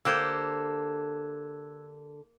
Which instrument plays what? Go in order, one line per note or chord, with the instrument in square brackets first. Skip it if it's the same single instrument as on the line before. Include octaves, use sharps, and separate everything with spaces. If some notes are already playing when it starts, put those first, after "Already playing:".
[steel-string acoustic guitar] D3 A4 [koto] A#3 G4 C5 [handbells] E6 F#6 G#6